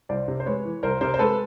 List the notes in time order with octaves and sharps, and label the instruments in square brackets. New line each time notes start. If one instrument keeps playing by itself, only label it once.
[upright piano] C2 C5 D5
C3
C5
G#3 B4 C#5
E3
C2 A#4 C5
C3 A#4 C5
C5
G#3 A4 B4